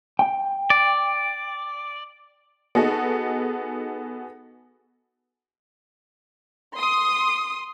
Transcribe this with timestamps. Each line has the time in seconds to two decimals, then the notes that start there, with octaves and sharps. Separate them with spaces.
0.19 G5
0.70 D5
2.75 B3 D#4 F#4 G#4 A4
6.76 C6 D#6